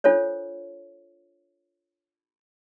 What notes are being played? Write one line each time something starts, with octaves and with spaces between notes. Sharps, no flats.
D4 F4 A4 C5 C#5